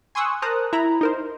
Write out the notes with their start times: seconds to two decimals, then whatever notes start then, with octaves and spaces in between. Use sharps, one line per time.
0.15 G#5 C6 C#6 D#6 E6 F#6
0.42 A#4 C5 A5 A#5 D#6 F#6
0.73 E4 A#5 B5
1.01 D#4 A#4 C5